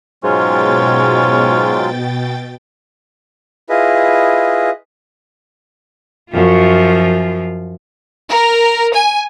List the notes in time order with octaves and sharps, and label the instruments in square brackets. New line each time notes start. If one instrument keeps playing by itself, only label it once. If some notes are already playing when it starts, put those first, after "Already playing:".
[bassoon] G#2 [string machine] B2 G5 A6 [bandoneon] F#3 G#3 F4 [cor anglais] C#4
[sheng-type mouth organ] E4 F4 G#4 B4 D#5
[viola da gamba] F#2 F3 F4
[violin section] A#4
G#5